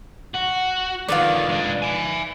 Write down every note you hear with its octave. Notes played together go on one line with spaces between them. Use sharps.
F#4
D3 D#3 F4 B4 D5
G#3 D4
E5 G#5